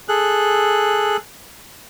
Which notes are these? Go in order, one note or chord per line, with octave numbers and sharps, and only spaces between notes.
G#4 A4 F#6